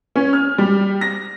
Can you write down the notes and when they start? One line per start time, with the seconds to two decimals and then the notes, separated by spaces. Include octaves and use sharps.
0.16 C#4
0.33 F6
0.58 G3
1.01 A#6